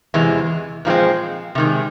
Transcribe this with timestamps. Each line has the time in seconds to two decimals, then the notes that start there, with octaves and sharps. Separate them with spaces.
0.14 E2 C3 E3 G#3
0.85 A#2 F3 G#3 C4
1.55 C3 D#3 G#3